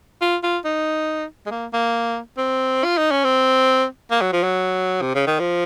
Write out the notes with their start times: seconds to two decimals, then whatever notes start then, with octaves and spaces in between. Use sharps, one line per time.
0.21 F4
0.43 F4
0.65 D#4
1.46 G#3
1.51 A#3
1.73 A#3
2.37 C4
2.84 F4
2.97 D#4
3.11 C#4
3.24 C4
4.11 A#3
4.21 F#3
4.32 F3
4.43 F#3
5.01 C3
5.15 C#3
5.27 D#3
5.40 F3